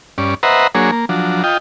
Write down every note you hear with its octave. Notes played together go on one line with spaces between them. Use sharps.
G2 C#4 D5
B4 C5 D#5 E5 F#5 A#5
F#3 A#3 D4 G#4 C#5
A#3
F3 F#3 D4
F4 D#5 G5